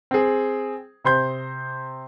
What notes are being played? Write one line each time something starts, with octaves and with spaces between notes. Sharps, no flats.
C4 G#4
C3 C5 C6 G6